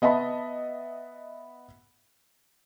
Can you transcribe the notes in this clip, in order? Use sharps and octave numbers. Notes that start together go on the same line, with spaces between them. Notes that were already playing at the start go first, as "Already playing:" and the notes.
B3 D#5 E5 A5 B5